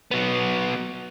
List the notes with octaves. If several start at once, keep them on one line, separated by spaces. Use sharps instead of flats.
F#3 B3